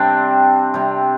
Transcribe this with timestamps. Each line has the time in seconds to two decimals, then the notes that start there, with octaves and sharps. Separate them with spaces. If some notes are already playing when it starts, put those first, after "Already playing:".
Already playing: C3 G3 C4 D4
0.74 C3 G3